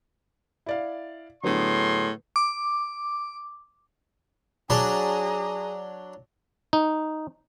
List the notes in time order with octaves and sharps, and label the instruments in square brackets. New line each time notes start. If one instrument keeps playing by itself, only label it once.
[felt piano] E4 D5 F5
[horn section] A2 G#4 C6 [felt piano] D3 F#3 B3
[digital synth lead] D6
[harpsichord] F#3 D4 D5 [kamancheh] G#4 A#5
[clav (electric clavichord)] D#4